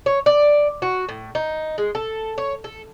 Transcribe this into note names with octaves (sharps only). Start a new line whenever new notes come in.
C#5
D5
F#4
A2
D#4
G#3
A4
C#5
A4